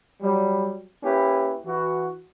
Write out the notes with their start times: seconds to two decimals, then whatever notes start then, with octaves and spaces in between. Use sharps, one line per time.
0.22 F#3 G3
1.03 A#3 C#4 E4 G4 B4
1.65 E3 F#4